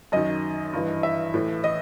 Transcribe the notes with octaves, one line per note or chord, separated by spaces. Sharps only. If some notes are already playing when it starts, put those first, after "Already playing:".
F#2 D#3 D#5
G2 E3
E5
A2 E3
D#5